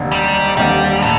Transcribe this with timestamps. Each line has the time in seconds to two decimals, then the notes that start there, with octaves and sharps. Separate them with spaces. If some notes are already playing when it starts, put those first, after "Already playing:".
Already playing: F1 D#2 D3
0.12 G3
0.57 F1 D#2 D3 G3
1.02 A2